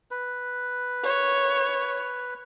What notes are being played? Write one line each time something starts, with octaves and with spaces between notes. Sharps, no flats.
B4
C#5